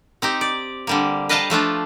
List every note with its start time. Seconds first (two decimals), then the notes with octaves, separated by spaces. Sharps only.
0.22 C4 D#4 G4
0.41 D5
0.87 D3 G3 A#3
1.29 B4 D#5 F5 G5 A5 A#5
1.50 F3 A3 D4 F4